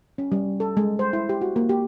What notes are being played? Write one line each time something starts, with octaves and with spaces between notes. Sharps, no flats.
C#4
G3
A4
G#3
C5
E4
G4
F#4
A#3
G4